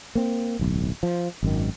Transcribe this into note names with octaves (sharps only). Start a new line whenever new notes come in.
A#3 C4
D1 B1
F3
G#1 F#2 D#3